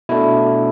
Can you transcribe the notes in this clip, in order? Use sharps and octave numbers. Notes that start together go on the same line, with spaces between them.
B2 A3 D4 E4